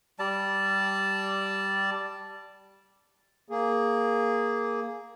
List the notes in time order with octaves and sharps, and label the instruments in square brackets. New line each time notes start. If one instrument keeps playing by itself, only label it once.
[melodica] G3 D5 A5
[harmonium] A#3 G#4